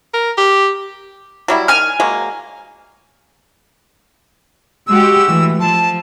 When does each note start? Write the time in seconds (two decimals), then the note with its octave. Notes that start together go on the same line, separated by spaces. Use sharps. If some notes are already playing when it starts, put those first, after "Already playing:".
0.14 A#4
0.38 G4
1.48 F#3 G3 E4
1.68 D#3 G#5 F6
2.00 F#3 G#3 A#3
4.88 G#3 F#4 G4 E6
5.28 E3 A3
5.60 F3 A5